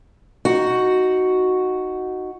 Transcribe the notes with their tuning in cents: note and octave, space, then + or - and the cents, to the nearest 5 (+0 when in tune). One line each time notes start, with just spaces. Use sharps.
D#4 +5 F#4 +0